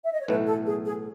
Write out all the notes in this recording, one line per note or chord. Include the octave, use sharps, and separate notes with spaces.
E5
D#5
C#5
B1 A2 E3 A3 B4
A4
G#4
G#4